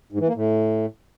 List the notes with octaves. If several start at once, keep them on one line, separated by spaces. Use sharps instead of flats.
G#2
E3
A#3
A2